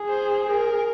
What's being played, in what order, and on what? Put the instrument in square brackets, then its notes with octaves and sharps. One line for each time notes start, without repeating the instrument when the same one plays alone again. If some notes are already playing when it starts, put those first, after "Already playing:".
Already playing: [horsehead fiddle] G#4
[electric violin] C5
A#4